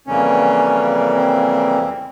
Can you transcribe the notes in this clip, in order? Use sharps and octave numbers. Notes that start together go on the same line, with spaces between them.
F2 C#3 E3 G3 A#3 C#4
C4